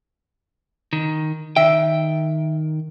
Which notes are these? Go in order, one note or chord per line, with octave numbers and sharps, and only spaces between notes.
D#3
D#3 E5 G5